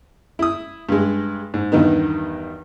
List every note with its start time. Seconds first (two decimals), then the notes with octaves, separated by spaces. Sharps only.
0.39 E4 D#6
0.89 G2 G#3
1.54 G#2
1.72 E2 G2 D#3 B3 D#4